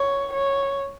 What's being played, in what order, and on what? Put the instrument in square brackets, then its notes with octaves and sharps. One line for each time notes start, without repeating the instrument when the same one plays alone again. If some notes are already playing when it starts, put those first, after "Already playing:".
Already playing: [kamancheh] C#5
C#5